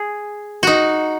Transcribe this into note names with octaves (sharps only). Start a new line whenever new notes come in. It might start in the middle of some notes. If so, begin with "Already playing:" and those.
Already playing: G#4
D#4 F#4